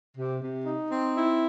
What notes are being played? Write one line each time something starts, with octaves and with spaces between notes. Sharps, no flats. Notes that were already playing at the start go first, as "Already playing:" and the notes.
C3
C3
D#4
C4
E4